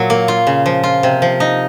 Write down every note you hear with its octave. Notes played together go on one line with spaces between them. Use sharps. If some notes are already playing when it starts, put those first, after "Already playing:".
Already playing: A#2 F#3
A#3
F4
C#3
F3
F4
C3
F3
D#4